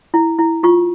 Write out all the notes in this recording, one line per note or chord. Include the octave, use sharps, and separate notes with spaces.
E4
E4
F4 C#6